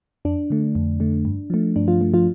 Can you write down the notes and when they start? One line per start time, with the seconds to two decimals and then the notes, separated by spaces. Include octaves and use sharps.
0.25 F2 D4
0.50 D3 A3
0.75 F2
1.00 D3 A3
1.25 G2
1.50 F3 A3
1.76 G2 D4
1.88 F3 F4
2.01 F3 A3
2.14 F3 F4